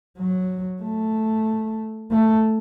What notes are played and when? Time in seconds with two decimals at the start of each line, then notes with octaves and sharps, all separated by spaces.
0.18 F#3
0.82 A3
2.11 A3